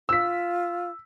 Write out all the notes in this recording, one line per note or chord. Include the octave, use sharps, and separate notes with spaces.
F4 E6 B6